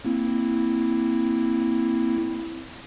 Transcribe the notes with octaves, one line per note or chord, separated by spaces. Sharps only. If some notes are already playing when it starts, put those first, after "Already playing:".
A#3 C4 E4